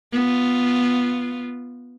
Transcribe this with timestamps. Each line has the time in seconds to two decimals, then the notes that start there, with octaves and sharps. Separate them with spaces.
0.13 B3 F4